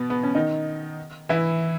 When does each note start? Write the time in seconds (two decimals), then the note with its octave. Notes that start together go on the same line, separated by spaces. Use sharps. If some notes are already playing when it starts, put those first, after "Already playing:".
Already playing: B2 B3
0.10 B3
0.23 C#4
0.35 D#3 D#4
1.29 E3 E4